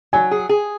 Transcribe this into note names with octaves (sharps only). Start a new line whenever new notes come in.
F#3 G#5
G#4
G#4